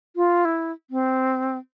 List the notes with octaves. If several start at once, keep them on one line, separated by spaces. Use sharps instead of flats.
F4
E4
C4